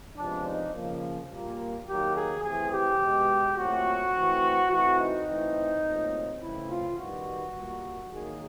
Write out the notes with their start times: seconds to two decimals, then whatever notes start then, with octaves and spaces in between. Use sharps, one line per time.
0.17 C3 F3 G#3 B3 D4
0.45 D#4
0.73 C#3 F3 A#3
1.30 A#2 G3 A#3
1.87 D#3 F#3 A#3 G4
2.16 G#4
2.44 E3 A3 C4 G#4
2.73 G4
3.01 B2 G#3 B3
3.58 A#2 F#3 A3 C4 F#4
4.14 E3 A3 C4
4.71 E3 A3 C4 F#4
5.00 D#4
5.28 E3 A3 C4
5.85 A#2 F#3 A3 C4
6.41 C#3 E3 A3 C4 E4
6.70 F4
6.98 D#3 G3 B3 F#4
7.55 A#2 G3 A#3
8.12 D#3 F#3 A#3 G#4